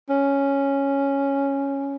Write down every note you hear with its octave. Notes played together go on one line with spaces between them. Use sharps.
C#4